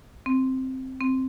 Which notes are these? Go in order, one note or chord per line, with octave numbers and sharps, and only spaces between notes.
C4
C4